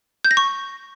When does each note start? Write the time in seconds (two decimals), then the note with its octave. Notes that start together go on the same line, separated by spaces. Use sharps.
0.24 G6
0.31 A#6
0.37 C#6